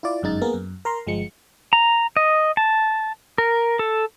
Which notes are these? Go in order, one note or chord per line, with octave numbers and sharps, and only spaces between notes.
E4 F4 D5
G1 F#2 G#3 D#4 A6
A#3 B3 G#4 A#4
F#2
A#4 A#5 C6
G1 F3 G#3 C#7
A#5
D#5
A5
A#4
A4